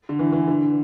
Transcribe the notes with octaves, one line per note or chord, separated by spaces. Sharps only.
D3
E3
E3
D3